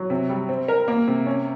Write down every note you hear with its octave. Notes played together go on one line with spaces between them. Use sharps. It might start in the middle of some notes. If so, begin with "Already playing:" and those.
Already playing: F#3
C3
G3
C4
A#4
A#3
C3
C#4